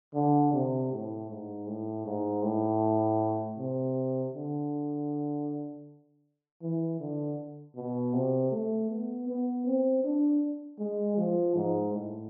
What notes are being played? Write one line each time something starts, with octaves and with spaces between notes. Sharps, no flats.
D3
C3
A2
G#2
A2
G#2
A2
C3
D3
E3
D3
B2
C3
A3
B3
B3
C4
D4
G#3
F3
G#2
A2